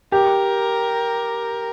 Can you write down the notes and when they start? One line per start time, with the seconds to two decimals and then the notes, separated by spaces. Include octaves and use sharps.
0.12 G4 A#4